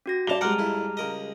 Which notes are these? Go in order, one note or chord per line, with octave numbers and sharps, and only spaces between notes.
C#4 F#4 A#6
G2 D5 A5 F7 G7
G3 G#3 C4 D5 F#5 A5 A#5 F6
F2 E4
C#2 A#4 D#5